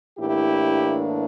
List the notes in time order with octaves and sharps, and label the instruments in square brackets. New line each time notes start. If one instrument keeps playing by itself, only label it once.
[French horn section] A2 E3 A#3 D4 E4 G4